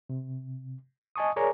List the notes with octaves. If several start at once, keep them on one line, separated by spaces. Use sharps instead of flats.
C3
D#5 G#5 A5 C#6 D#6
G#4 A#4 C#5 D5 G#5 A#5